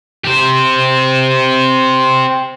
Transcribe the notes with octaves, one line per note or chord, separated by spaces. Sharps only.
G4 C5